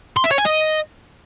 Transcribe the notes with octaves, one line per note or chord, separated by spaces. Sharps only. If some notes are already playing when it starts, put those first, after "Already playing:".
C6
E5
C#5
G#5
D#5